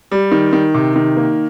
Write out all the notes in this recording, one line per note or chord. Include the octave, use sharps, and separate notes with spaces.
G3
D#3
D#3
C3
D#3
A#3